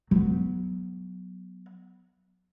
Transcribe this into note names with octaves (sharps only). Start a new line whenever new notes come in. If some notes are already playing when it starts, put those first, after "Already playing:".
F#3 B3